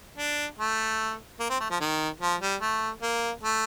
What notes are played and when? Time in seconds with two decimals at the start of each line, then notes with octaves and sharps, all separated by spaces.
0.17 D4
0.58 A3
1.40 A#3
1.49 C4
1.60 A3
1.70 F3
1.80 D#3
2.21 F3
2.41 G3
2.61 A3
3.02 A#3
3.43 A3